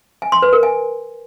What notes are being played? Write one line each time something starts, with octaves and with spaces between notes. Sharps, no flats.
G#5
C6
B4
A#4
G#5